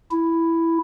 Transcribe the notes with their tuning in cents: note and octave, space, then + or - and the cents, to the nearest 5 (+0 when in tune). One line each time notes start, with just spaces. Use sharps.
E4 +5